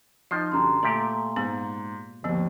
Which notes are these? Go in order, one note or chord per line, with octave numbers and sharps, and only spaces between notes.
F3 D#4 C7
F#2 D3 G3 A#5 C6
A#2 A3 G4 D5
G#2 G#3 B3
G#1 D#2 F3 B3